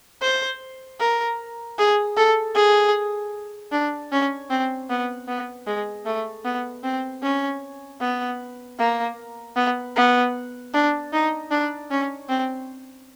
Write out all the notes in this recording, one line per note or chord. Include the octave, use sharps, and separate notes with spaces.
C5
A#4
G#4
A4
G#4
D4
C#4
C4
B3
B3
G#3
A3
B3
C4
C#4
B3
A#3
B3
B3
D4
D#4
D4
C#4
C4